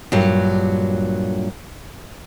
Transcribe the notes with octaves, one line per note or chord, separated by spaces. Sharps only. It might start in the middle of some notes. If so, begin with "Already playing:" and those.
G2 A#2 F#3